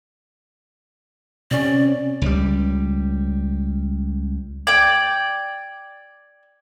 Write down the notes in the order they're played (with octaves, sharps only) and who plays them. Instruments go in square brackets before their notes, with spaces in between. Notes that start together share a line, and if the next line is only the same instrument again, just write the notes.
[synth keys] C3 C#4 [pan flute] D5
[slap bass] C#2 G3
[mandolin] D5 G5 [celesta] G#6